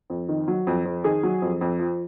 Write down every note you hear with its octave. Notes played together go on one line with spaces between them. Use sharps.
F2
D#3
F#3
F2
F2
D#3 G#4
F#3
F2
F2
F3